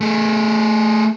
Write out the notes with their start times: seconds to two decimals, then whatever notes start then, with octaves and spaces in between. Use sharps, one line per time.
0.01 A3 G#4